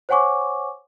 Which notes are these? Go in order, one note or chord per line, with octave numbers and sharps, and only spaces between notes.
C5 C#5 F#5 G#5 C#6 D6